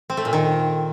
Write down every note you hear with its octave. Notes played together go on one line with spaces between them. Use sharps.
C4
A3
A#2
D#3